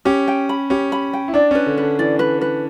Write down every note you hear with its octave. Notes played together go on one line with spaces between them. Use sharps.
C#4 G4
G5
B5
C#4 G4
B5
G5
E4
D4 D5
C#4 B4
D3
D3 B4
E3 D5
B4
B4